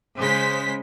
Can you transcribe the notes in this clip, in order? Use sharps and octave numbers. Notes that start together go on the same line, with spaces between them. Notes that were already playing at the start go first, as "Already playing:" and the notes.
C#3 G#3 C5 B6